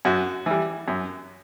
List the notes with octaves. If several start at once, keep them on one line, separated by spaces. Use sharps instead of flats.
F#2 F#4
E3 G3
F#2